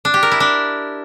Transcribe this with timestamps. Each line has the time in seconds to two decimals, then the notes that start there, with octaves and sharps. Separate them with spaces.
0.05 D4
0.14 G4
0.23 A#4
0.31 E4
0.40 D4